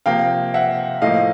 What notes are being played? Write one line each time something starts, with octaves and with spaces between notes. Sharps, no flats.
C3 F3 A#3 F5 G5
E5 F#5
A2 F3 A#3 D#5 F5